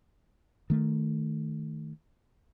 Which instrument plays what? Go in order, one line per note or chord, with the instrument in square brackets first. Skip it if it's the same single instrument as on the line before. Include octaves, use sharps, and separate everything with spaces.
[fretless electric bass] D#3 A3